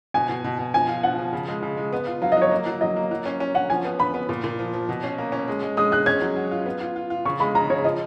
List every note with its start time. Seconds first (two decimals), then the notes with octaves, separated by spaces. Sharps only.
0.14 B2 G#5
0.29 B2
0.44 B2
0.59 B2
0.74 F3 G#5
0.89 F4
1.03 F3 F#5
1.18 F3
1.33 C#3
1.48 G#3
1.62 C#3
1.77 G#3
1.93 B3
2.07 F4
2.22 F#3 F5
2.32 D#5
2.37 F#3 C#5
2.51 A#3
2.66 F#3
2.81 F#3 D#5
2.96 A#3
3.11 F#3
3.26 C#4
3.40 C#4
3.55 C#4 F#5
3.70 F3 G#5
3.85 B3
3.99 B3 B5
4.14 B3
4.29 A#2
4.44 A#2
4.59 F3
4.73 F3
4.89 B2
5.03 C#4
5.18 A#3
5.32 C#4
5.48 G#3
5.63 G#3
5.77 G#3 D#6
5.92 G#3 F#6
6.06 C#4 G#6
6.22 F#3
6.36 F#3
6.51 F4
6.66 B3
6.81 F4
6.96 F4
7.10 F4
7.25 C#3 C#6
7.40 G#3 B5
7.55 C#3 A#5
7.70 C#3 C#5
7.84 F3 D#5